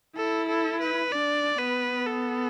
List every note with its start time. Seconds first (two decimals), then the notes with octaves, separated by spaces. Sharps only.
0.16 E4 A4
0.49 A4
0.81 B4
1.12 D4 D5
1.58 B3 B4
2.06 A4